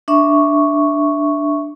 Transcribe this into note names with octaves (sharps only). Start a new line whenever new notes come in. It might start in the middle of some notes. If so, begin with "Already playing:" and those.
D4 E5 C#6